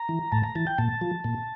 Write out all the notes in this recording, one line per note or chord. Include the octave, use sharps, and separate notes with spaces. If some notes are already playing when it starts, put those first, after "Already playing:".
Already playing: A#5
E3
A2 A5
A#5
E3 A5
G5
A#2 A5
F3
A#2